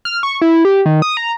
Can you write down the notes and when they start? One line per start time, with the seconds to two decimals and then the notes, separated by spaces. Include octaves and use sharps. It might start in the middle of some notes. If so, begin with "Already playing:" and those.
0.05 F6
0.23 C#6
0.42 E4
0.65 G4
0.86 D#3
1.02 D#6
1.17 A#5